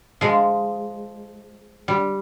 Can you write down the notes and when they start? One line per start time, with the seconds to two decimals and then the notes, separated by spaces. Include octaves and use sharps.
0.21 F3 G#3
1.88 G3